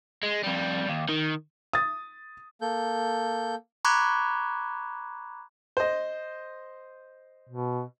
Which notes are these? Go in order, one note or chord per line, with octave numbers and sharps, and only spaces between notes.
G#3
F2 G3
D#2
D#3
D#6 A6
A#3 A4 G6
A#5 B5 C#6 D6 F#6 G#6
C5 D#5
B2